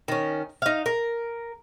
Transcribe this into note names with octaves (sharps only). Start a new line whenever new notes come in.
D#3 C#4
D#4 F5
A#4